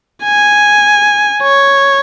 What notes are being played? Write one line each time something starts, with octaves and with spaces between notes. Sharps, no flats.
G#5
C#5